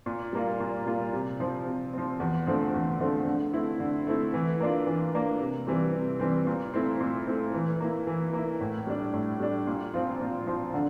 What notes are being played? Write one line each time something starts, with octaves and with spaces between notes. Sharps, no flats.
A#2
G3 A#3 F4
A#2
G3 A#3 F4
C3
F3 C4
C3
F3 C4
E2
D3 F3 A3 C4
E2
D3 F3 A3 C4
D3
A3 C4 E4
D3
A3 C4 E4
E3
A#3 D4 F4
E3
A#3 D4 F4
C3
E3 G3 C4
C3
E3 G3 C4
A#2
A3 C4 E4
A#2
A3 C4 E4
E3
A#3 E4
E3
A#3 E4
A2
G3 D4
A2
G3 D4
A#2
F3 C4 F4
A#2
F3 C4 F4
D3